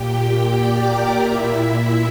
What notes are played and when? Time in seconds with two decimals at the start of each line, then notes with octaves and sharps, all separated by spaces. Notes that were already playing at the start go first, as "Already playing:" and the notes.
Already playing: A#2 G4 G5
0.18 G4 G5
0.51 D5 D6
0.85 A#4 A#5
1.19 A#2 E4 E5
1.52 E4 E5